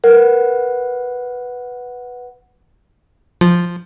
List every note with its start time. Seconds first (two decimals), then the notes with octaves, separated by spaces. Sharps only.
0.04 A#4 B4 F#5
3.41 F3